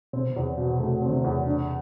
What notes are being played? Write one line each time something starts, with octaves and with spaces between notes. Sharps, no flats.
B2 C4
C3
E2
B2
C3
C3 A3
C4
D3
C3
E2
D4